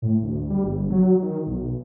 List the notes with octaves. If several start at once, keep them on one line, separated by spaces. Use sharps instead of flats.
A2
D2
G3
G1
F#3
D#3
B1